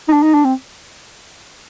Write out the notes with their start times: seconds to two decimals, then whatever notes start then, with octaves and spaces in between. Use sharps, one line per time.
0.09 D#4
0.13 D4
0.23 D#4
0.34 D4
0.44 C4